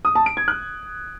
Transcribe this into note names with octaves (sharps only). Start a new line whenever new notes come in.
D#6
A5
D7
G#6
F#6